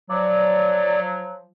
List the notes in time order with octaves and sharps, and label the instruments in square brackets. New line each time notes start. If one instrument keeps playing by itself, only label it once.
[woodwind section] F3 F#3 [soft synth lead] D5